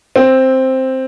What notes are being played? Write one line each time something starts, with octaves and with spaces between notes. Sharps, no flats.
C4